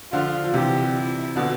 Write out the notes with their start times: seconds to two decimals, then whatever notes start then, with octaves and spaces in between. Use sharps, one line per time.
0.12 D3 F3 F4
0.44 F3
0.54 C3 E3 G4
0.95 E4
1.36 B2 D3